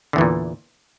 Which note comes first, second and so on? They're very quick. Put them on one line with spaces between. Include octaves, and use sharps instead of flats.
D3 E2 E3 A#2